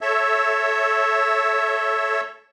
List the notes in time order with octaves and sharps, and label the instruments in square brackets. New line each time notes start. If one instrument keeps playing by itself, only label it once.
[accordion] A4 C#5 E5